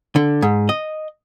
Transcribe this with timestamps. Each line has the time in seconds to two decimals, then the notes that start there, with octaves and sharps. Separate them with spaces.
0.16 D3
0.42 G#2
0.69 D#5